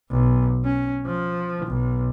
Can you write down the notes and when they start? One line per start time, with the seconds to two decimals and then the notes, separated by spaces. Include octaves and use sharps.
0.10 B1
0.64 C#4
1.06 F3
1.66 B1